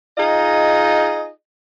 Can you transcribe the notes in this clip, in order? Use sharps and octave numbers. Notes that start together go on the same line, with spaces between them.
D#4 F4 G#4 D#5